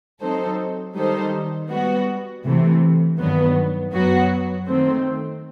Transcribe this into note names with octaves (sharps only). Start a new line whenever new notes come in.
F#3 C4 D#4 A4 C5
D#3 G3 D#4 A4 C5
G3 B3 F#4
C3 E3 A3
G2 D#3 F#3 B3
F#2 F#3 B3 F#4
D#3 A3 C4